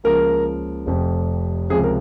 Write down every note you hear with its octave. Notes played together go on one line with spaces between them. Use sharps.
C#2 C#3 F3 A#3 A#4
F1 F2 C3
C#2 C3 F3 G#4
A#4